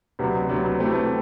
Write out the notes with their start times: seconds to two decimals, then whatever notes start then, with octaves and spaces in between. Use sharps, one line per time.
0.19 D2 C3 F#3 B3
0.49 D2 C3 F#3 B3
0.79 E3 A3 C4 G4